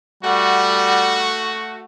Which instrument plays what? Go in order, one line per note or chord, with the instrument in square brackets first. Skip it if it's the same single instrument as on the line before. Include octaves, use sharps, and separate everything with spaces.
[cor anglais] G3 [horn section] A3 F#4 [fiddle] F#5